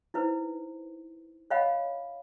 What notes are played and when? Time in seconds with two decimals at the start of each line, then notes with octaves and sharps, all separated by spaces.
0.14 D#4 E4 B4 C5
1.50 C#5 D#5 F5 F#5 B5